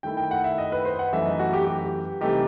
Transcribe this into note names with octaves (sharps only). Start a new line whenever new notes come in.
D#3 A3 E4 G5
G5
F#5
E5
D#5
B4
C5
F#5
F#2 E3 A3 D#4 E5
D#5
F#4
G4
G4
C3 E3 A3 D#4 G4